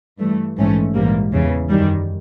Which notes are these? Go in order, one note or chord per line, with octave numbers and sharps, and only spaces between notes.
G2 E3 A3
A#1 G#2 E3 A3 C#4
A#1 G#2 E3 G3 A#3
E2 C#3 E3
F#2 D#3 G3